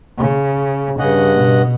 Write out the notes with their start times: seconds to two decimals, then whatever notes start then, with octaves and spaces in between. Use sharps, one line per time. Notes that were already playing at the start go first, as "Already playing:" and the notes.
0.18 C#3
0.99 G2 C#3 D#5 F#5
1.34 B2